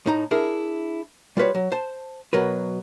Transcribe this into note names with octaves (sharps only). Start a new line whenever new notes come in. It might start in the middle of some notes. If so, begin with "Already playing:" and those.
A2 D#4 A#5
D4 E4 G#4 A#4
G3 F4 F#4 B4 C#5
F#3
C5 A5
B2 F#3 A#4 B4